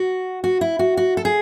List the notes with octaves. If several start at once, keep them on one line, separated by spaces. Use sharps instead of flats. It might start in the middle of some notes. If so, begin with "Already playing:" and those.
Already playing: F#4
F#4
E4
F#4
F#4
A4
G#4